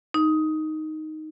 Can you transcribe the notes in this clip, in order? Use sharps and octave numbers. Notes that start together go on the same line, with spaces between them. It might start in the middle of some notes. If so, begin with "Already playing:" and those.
D#4